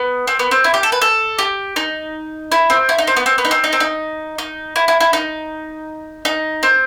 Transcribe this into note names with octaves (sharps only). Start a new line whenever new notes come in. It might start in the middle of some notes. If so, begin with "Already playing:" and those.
Already playing: B3
C4
B3
C4
E4
G4
A4
B4
A4
G4
D#4
E4
C4
E4
D#4
C4
B3
C4
B3
D#4
C4
D#4
C4
D#4
D#4
E4
E4
E4
D#4
D#4
C4